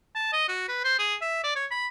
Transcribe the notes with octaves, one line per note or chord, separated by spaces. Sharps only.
A5
D#5
F#4
B4
C5
G#4
E5
D5
C#5
B5